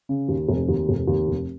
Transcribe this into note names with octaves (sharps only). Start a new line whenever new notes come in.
C#3
D#2
F1
D#2
F1
D#2
F1